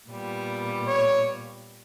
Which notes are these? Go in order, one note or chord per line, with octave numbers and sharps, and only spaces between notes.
A#2 G3 B3
C#5